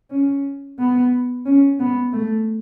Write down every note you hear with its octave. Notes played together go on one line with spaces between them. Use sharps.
C#4
B3
C#4
B3
A3